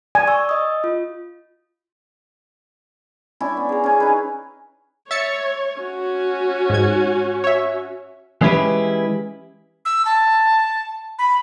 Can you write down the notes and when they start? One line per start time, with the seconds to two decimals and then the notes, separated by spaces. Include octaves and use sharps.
0.15 D5 G#5
0.27 C#6 E6
0.49 D#5 D#6
0.84 F4
3.40 C#4 D4 E4 G#5
3.57 B3
3.69 G#4 A#5
3.84 C#4 G#5
4.00 D#4 B4
5.11 C#5 E5 A6 C#7
5.80 C#4 F#4
6.70 G#2 G#6
7.44 C#5 E5
8.41 E3 G#3 C#4 E4 G4 B4
9.85 E6
10.05 A5
11.19 B5